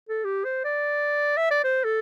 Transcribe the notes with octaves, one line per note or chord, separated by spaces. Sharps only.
A4
G4
C5
D5
E5
D5
C5
A4